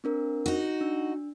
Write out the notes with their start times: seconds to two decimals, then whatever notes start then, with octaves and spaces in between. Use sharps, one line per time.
0.04 C4 D4 A#4
0.46 D#4 F#4
0.81 D4